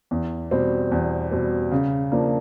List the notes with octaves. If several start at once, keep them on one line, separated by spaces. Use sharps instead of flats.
E2
B2 G3 C4
E2
B2 G3 C4
C#3
F3 A#3 D4